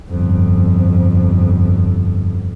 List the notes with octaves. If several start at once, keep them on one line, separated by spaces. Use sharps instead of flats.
G1 F2